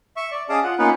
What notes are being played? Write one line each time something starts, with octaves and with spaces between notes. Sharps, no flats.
E5 C#6
D5
C#4 G#4 D#5 F5 A5 D6
F4 F#5
A#3 B3 C#4 D#4 F4 B4